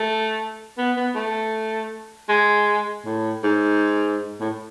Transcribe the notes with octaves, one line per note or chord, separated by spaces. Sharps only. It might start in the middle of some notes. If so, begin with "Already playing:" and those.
Already playing: A3
B3
B3
A3
G#3
A2
G#2
A2